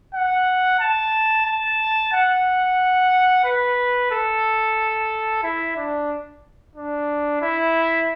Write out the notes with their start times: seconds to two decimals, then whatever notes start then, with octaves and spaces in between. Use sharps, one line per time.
0.15 F#5
0.80 A5
1.46 A5
2.13 F#5
3.45 B4
4.11 A4
5.43 E4
5.77 D4
6.76 D4
7.42 E4